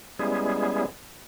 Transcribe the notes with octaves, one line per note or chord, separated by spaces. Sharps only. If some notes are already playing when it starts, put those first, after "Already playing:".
G3 G#3 B3 C#4 E4 G#4